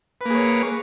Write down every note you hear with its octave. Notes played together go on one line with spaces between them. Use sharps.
A#3 G#4 B4 C#5